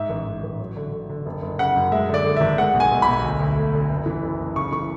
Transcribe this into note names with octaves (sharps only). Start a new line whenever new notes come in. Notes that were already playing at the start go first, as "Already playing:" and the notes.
Already playing: G#2 E5
A1
G#2
A1
F#3
D3
D3
D3
F#1
F#1
C#3 F#5
F#2
G#3 E5
D3
D5
D3
G#1 E5
G#3 F#5
B1
G#5
B1
B5
B1
D2
D2
A3
D3
F#1
E3
F#1
F#1
C#3 C#6
E3 C#6